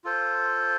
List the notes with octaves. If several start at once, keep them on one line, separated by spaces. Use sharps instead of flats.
F4 A4 C5